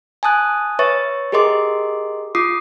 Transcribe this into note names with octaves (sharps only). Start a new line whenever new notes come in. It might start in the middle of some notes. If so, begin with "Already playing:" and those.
G#5 A5 D#6 F#6
B4 C#5 E5 C#6 A6
G4 G#4 A#4 D#5 C6 D6
F4 D6 D#6 C7